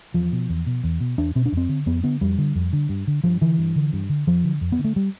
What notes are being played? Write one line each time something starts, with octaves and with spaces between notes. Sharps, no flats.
E2 F3
B2
E2
B2
E2
B2
E2 D4
B2 C4
D4
F2
C4
D3
F2 B3
D3 B3
F2 G3
D3
F2
D3
G2
D3
G2 F3
D3 E3
G2
D3
G2
D3
F2 F3
D3
F2
B3
D3
A3
G3